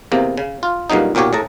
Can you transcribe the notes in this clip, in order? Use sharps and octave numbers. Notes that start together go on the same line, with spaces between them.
E2 C3 A#3
C#3
F4
G2 A#2 C#3 F#3 D#4
B1 A#2 F#3 G4 C#5
A2 G#4 A5 A#5